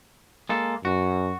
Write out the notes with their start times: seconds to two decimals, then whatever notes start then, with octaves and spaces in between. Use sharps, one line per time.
0.49 G#3 A#3 A4
0.85 F#2 F#4